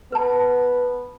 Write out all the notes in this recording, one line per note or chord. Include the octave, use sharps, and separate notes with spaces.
B3 B4 A5